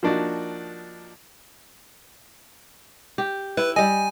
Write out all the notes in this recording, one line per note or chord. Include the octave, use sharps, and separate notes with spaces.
F3 A#3 D4 D#4 F#4
G4
E4 B4
G3 D#5 G#5